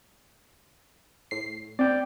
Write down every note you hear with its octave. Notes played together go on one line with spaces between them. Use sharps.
A2 C7
C4 D5 G5